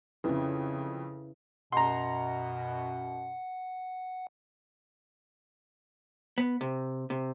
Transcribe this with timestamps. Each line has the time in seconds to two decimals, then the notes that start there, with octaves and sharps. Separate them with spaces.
0.24 F2 C#3 C#4 E4 B4
1.72 F#2 B2 F#5 A#5 C6
6.38 B3
6.61 C3
7.10 C3